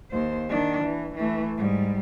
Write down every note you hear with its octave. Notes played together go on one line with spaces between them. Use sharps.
D#2 C5
D#3 D4
E3
E3 A3
G#2 G3